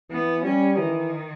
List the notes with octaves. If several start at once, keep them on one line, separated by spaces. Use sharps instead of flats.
E3 B3
G3 C#4
D#3 E3